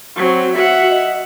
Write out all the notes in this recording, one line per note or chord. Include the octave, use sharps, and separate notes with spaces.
F#3 C4
F#4 E5 F#5
D#5